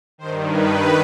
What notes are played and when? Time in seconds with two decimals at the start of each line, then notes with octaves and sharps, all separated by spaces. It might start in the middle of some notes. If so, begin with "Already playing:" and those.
0.18 G2 D#3 C5
0.51 B4